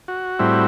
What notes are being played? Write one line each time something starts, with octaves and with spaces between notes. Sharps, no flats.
F#4
A2 G3 C4 E4